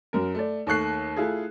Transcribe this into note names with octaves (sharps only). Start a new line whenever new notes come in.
F#2 A#4
A3 D5
D#2 A3 C#6 F#6 C7
A3 E4 F4 G#4